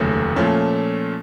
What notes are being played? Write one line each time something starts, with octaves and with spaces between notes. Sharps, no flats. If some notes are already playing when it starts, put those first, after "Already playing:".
Already playing: F1 D#2 C#3 F#3 A3
A#2 F3 A3 C#4